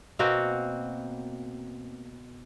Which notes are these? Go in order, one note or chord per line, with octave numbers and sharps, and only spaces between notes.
B2 A#3 C4 F#4